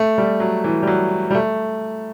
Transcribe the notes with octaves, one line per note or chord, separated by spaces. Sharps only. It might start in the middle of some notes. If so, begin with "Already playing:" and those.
Already playing: A3
G3
F#3
E3
G3
F#3
G3
A3